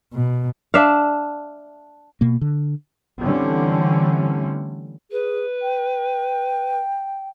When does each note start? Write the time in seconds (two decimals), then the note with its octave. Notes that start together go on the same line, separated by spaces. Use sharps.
0.13 B2
0.74 D4 E5 F5
2.21 B2 A#3
2.41 D3
3.20 D3 E3 G3 A3 C4 C#4
5.11 G#4 B4
5.62 G5